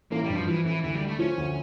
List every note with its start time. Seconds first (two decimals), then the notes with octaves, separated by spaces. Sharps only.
0.11 A1 A#3
0.24 G3
0.30 G2
0.35 F3
0.47 E3 F3
0.65 A1 E3
0.83 D2 E3
0.95 G3
1.01 D3
1.08 A3
1.19 F3 C#4
1.38 D2